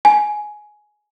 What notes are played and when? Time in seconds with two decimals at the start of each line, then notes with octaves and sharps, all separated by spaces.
0.05 G#5